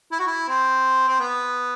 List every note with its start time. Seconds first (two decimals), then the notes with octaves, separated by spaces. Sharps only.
0.12 E4
0.19 F#4
0.27 E4
0.48 C4
1.08 C4
1.20 B3